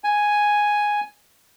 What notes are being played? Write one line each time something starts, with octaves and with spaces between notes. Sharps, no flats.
G#5